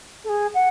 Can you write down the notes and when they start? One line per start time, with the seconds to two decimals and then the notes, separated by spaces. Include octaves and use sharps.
0.24 A4
0.29 G#4
0.54 F#5